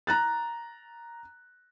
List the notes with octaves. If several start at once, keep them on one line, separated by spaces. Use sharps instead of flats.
A#5 F#6 A6